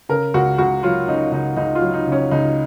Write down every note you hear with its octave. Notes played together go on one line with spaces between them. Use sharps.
C#3 A#4
C#2 F#4
C#2 F#4
F#3 F4
C#3 D#4
C#2 D#4
C#2 D#4
F4
F#3
D#4
C#3
C#4
C#2 D#4